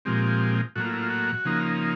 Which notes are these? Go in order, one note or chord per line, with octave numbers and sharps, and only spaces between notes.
A#2 F3 G#3 C4 G4
A2 F#3 A#3 F#4
F4
E4
F4
F#4
C#3 F3 A#3 D#4